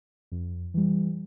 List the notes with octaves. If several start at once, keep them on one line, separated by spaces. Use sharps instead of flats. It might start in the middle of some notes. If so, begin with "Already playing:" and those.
F2
E3 G3